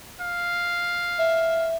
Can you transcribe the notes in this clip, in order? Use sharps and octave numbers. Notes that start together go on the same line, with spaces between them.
F5
E5